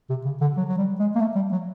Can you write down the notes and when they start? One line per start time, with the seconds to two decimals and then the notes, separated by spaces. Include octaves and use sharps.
0.10 C3
0.25 C#3
0.41 D3
0.57 F#3
0.68 F#3
0.78 G3
0.99 G#3
1.15 A#3
1.20 A3
1.36 G3
1.52 F#3